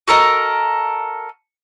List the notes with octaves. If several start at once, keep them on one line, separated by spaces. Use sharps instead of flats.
F#4 A4 A#4 D#5